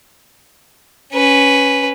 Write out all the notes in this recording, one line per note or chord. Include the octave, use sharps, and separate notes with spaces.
C#4 B4